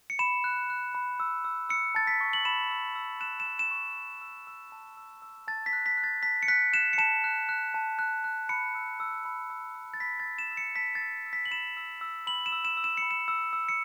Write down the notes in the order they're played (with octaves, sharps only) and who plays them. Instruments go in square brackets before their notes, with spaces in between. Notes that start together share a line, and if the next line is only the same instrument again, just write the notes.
[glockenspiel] C#7
B5 E7
F#6
F#6
B5
E6
E6
E6 C#7
A5 A6
B6
C#6
F#7
B5 E7
E6
E6
F#6 E7
E7
A5
E7
C#6
B5
E6
E6
A5
E6
E6
A5 A6
B6
F#6
B6
F#6
A6
A5 B6
C#7
F#6 B6
F#6 E7
C#7
A5 E7
F#6
F#6
A5
F#6
F#6
B5 C#7
E6
E6
B5
E6
E6
A6
B5 B6
A6
E6
E7
E6
C#7
A5 B6
A6
E6
E6
B6
F#7
B5 E7
E6
E6
B5 F#7
E7
E6
E7
E6
E7
B5 C#7
E7
E6
E6
C#7